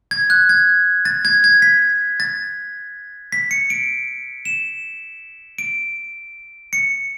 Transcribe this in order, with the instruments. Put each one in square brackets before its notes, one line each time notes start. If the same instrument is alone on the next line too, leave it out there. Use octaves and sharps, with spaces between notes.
[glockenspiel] G#6
F#6
G#6
A6
G#6
G#6
B6
A6
B6
C#7
D7
E7
D7
C#7